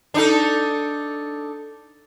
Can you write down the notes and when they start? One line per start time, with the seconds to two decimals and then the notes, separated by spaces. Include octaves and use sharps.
0.14 D4 D#4 A4